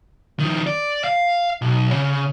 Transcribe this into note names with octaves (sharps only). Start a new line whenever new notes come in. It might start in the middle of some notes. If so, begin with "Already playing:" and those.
D#3 F3
D5
F5
B1
C#3